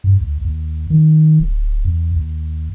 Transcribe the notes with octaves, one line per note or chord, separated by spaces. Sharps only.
G2
D2
D#2
D#3
D1
E2
D#2